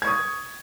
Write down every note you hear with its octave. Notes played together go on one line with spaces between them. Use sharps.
C#6 D#6 G#6